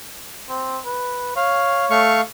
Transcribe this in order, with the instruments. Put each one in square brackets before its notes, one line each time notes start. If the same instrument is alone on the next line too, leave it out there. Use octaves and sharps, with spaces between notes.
[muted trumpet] C4
B4
[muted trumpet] C#5 [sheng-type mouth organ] F5
[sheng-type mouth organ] A3 F5 C#6